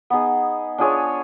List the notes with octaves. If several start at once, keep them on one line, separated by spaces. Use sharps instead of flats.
B3 D#4 G#4
D4 F4 G#4 C#5